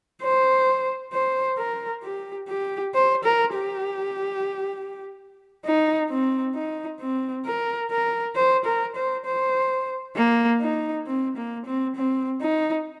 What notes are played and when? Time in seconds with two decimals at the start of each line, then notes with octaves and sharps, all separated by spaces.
0.23 C5
1.13 C5
1.58 A#4
2.03 G4
2.48 G4
2.94 C5
3.24 A#4
3.54 G4
5.65 D#4
6.09 C4
6.55 D#4
7.00 C4
7.45 A#4
7.91 A#4
8.35 C5
8.65 A#4
8.96 C5
9.25 C5
10.16 A#3
10.61 D#4
11.07 C4
11.37 A#3
11.66 C4
11.96 C4
12.41 D#4